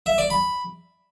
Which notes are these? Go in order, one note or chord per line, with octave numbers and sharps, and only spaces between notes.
E5
D5
B5